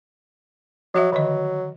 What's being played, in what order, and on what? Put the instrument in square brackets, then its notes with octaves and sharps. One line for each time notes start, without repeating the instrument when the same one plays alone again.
[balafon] F3 F#4 E5 [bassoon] F#3
[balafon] D3 D#3 D#5 [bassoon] F#3